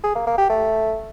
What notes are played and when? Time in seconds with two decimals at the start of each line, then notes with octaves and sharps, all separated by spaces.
0.04 G#4
0.15 A#3
0.27 A#3
0.38 G4
0.49 A3